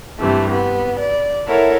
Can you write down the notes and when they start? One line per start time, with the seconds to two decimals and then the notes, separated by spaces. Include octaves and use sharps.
0.19 G2 C3 E3 A3
0.50 B3
0.99 D5
1.47 E4 A4 A#4 C#5 E5 F#5